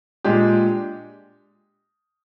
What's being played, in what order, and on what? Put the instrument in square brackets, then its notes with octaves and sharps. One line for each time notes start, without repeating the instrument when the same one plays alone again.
[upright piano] A#2 G#3 D4 G4